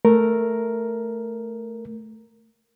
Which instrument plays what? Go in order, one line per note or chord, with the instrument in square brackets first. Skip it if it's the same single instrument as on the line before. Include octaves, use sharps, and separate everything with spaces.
[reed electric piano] A3 A#4